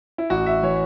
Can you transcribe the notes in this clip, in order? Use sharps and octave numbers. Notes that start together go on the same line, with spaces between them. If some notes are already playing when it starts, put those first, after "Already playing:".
E4
A1 F#4
E5
E3 C#5